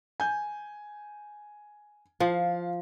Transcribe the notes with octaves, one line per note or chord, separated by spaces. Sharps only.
G#5 G6
F3 F5